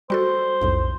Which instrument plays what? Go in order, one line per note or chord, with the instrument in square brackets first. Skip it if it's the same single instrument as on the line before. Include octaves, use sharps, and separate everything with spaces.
[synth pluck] G3 F#4 A4 [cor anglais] C5
[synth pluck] B1 F2 A2